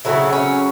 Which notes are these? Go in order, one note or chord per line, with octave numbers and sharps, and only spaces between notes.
C#3 F#3 A3 E4
C#4